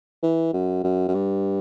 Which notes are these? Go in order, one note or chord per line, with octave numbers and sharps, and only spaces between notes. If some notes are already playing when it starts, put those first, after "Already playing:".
E3
F#2
F#2
F#2
G2